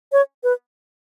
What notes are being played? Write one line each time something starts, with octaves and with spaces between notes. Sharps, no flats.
C#5
B4